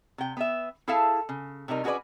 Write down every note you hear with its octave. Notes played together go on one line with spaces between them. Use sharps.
C3 G5
B3 B4 E5
E4 G#4 A4 E5 F5 A5
C#3
C3 G3 D4 D#4 A#4
C#4 F#4 G#4 A4 B4 D5